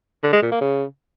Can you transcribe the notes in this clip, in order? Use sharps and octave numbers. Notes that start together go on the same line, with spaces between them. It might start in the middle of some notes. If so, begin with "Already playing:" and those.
D3
G#3
A#2
A#3
C#3